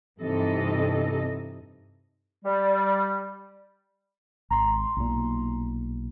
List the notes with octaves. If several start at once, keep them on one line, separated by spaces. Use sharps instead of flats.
G2 C3 E3 D#4 A4 D#5
G3
G#1 A#5 C6
B1 A#2